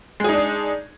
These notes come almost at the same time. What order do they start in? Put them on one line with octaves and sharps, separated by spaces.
G#3 G#4 D#4 D4